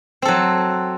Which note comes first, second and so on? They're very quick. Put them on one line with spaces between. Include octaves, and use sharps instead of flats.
C4 A4 F#3